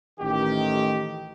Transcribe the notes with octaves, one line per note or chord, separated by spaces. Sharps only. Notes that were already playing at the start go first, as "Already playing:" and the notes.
A1 D#3 G4